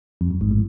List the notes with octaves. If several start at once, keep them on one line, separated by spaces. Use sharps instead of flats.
F2
F#2
G#1 G#2
A2